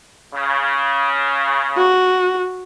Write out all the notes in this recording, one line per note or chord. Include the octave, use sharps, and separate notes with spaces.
C#3
F#4